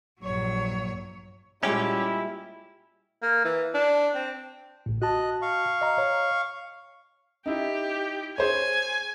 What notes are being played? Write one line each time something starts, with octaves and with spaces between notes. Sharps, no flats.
A#1 G2 F#3 C#5
A#2 G3 G#3 C#4 E4 F#4 G4
A#3
E3
D4
C4
A1 A2
F#4 D#5 A5 F#6
F5 C#6
D#5 A#5
C#5
D#4 E4 G4
G#4 C5 C#5 G#5